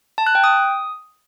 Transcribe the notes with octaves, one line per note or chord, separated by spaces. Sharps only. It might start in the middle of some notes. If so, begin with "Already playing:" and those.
A5
F#6
G5
D#6